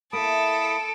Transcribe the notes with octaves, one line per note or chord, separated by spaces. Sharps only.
A#3 E4 A4 B5 D#6 D7